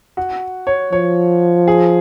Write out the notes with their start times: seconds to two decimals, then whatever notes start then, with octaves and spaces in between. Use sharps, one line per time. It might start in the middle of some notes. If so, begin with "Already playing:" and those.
0.17 F#4
0.67 C#5
0.92 F3 C#5
1.68 G#4